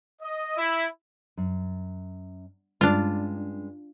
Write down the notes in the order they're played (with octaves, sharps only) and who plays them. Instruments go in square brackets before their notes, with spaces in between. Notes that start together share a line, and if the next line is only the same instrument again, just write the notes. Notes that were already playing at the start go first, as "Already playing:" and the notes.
[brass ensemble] D#5
E4
[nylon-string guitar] F#2
[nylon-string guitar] G2 G#3 C#4 [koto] D4 F4